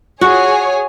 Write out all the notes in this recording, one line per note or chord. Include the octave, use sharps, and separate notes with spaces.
F#4 G#4 C#5 G#5